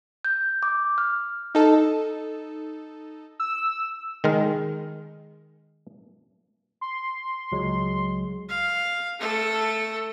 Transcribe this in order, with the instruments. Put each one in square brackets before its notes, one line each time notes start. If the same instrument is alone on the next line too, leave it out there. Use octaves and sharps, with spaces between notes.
[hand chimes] G6
D6
F6
[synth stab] D#4 A4
[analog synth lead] E6
[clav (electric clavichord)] D#3 G#3 A#4
[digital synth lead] C6
[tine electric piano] C#2 F#3 G#3
[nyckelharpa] F5
A3 A4